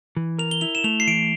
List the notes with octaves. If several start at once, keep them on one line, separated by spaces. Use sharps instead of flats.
E3
A#4 F7
G7
E4 F7
E7
A3 F7
C7
E3 D7